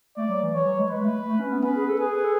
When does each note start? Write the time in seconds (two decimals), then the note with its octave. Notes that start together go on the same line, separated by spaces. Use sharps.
0.17 A3 D5
0.29 F#3
0.42 E3
0.54 E3 C#5
0.66 F#3
0.78 G#3
0.90 G#3 B4
1.03 A3
1.27 A3
1.39 C#4
1.52 B3
1.63 C#4 B4
1.76 G#4
1.88 A4
2.00 G#4 B4
2.15 B4
2.24 A4